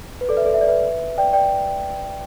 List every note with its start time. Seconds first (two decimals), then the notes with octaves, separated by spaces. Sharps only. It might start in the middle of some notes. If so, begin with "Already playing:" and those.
0.21 B4
0.29 A4 D5
0.37 B4 E5
0.45 A4 D5
0.54 E5
0.61 D5
0.68 B4 E5
1.18 D5 G5
1.33 D5 G5